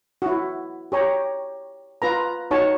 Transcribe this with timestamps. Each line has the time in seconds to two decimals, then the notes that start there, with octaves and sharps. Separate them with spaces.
0.22 E4 F#4
0.92 G4 C#5 A#5
2.02 F4 B4 A#5
2.51 D#4 F#4 C#5 A5